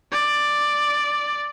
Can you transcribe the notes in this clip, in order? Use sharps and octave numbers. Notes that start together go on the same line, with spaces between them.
D5